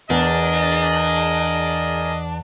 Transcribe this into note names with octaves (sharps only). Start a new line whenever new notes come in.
E2 D4 G#4 A#4 D#5